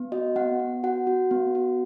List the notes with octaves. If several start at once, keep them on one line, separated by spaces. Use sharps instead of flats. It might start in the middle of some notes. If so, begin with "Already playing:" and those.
Already playing: B3
F#4 D#5
B3 F#5
B3
F#4 F#5
F#4
B3
F#4